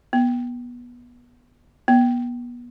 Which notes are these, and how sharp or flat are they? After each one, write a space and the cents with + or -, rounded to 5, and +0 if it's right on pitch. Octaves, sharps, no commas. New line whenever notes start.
B3 -20
B3 -30